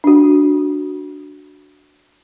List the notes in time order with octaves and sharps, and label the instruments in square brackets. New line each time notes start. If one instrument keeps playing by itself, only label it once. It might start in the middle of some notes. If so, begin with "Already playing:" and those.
[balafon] D4 F#4